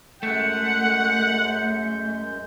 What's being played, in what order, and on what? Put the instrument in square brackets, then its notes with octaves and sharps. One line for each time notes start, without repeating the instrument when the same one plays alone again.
[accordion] F#2 G#3 G6 [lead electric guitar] A3 [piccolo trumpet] F#5 [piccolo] C#7